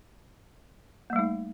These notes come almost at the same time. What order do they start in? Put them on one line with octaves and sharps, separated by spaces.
A#3 G3 A3 D#4